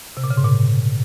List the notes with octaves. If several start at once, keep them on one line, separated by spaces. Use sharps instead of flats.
C3
A#2
C#3
G#2
A#2